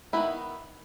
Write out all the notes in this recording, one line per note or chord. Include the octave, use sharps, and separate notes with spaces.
D#3 G#3 B3 D#4 E4